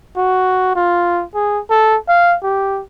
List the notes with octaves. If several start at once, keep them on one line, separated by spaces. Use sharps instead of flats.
F#4
F4
G#4
A4
F5
G4